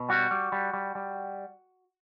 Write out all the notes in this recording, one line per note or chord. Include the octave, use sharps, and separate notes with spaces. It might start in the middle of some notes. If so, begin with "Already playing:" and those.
Already playing: B2
G3 F#4
G3
G3
G3
G3